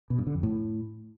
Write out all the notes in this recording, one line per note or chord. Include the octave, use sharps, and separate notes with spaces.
B2
G2
D3
F2
A2